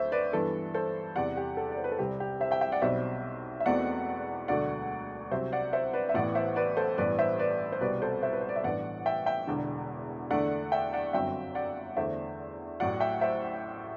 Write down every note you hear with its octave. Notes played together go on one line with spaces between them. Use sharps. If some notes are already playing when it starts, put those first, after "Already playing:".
Already playing: D2 A3 C5 E5
B4 D5
G2 E3 B3 A4
A4 C5
E2 C3 G3 D5 F#5
G4
A4
D5
C5
B4
A4
C2 C3 G3 C4 G4
G4
C5 E5
E5 G5
E5 G5
D5 F#5
B1 B2 G3 C4 C5 E5
E5
E1 E2 B2 A3 C4 D5 F#5
E1 D2 D3 F#3 A3 D5 F#5
C2 C3 F#3 C4 C5 E5
D5 F#5
C5 E5
B4 D5
E5
A1 A2 E3 B3 D5 F#5
C5 E5
B4 D5
A4 C5
A1 G2 E3 B3 D4 B4 D5
C5 E5
B4 D5
C5
C2 B2 G3 C4 B4 D5
A4 C5
C5 E5
B4
C5
D5
E5
A1 G2 E3 B3 D5 F#5
E5 G5
E5 G5
E1 E2 D3
E2 D3 A3 D4 D5 F#5
E5 G5
D5 F#5
G1 F#2 D3 F#3 C4 E5 G5
D5 F#5
E2 D3 A3 D4 C5 E5
A1 A2 F#3 D5 F#5
E5 G5
C5 E5